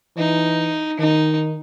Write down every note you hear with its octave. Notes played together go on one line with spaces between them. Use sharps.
E3 D#4
D#3 D#4